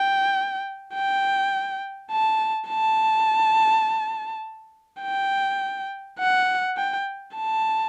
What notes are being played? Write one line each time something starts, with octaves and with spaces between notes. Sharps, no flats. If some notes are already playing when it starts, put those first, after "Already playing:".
Already playing: G5
G5
A5
A5
G5
F#5
G5
A5